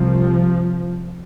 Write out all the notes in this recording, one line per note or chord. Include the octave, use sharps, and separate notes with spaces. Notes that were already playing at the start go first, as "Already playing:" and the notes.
Already playing: C2 C3 F3